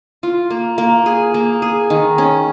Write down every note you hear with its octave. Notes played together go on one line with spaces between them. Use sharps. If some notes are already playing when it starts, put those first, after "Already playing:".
F4
A#3
A#3
G#4
A#3
G#4
D#3
C#4